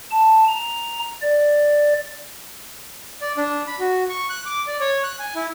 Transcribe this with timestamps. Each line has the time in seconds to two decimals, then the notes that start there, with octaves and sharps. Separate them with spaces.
0.11 A5
0.48 A#5
1.22 D5
3.21 D5
3.37 D4
3.67 B5
3.79 F#4
4.09 C#6
4.30 F#6
4.46 D6
4.67 D5
4.81 C#5
5.04 F#6
5.19 G#5
5.35 E4